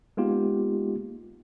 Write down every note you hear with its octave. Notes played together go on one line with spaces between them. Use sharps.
G#3 A#3 B3 D#4 F4 G4